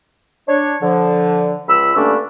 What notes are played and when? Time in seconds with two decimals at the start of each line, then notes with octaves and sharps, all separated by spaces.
0.48 D4 C#5
0.83 D3 F3
1.69 C#2 B5 E6
1.96 G2 D3 A3 A#3 C#4 D4